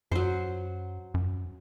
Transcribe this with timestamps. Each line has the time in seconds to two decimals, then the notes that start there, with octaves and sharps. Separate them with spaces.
0.11 F#2 F#3 C5
1.14 F#2